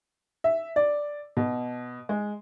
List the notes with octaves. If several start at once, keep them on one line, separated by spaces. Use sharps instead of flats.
E5
D5
B2
G#3